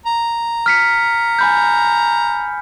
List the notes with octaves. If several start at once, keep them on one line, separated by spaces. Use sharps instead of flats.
A#5
F6 B6 C#7
G#5 B5 G6